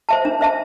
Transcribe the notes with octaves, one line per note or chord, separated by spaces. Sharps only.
C5 E5 A5
D4
C5 E5 A5